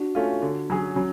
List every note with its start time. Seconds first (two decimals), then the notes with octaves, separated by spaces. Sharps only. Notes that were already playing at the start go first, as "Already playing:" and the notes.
Already playing: D4 F#4
0.15 A3 C#4 F4
0.42 D3
0.70 F#3 C#4 G#4
0.96 F#3 C#4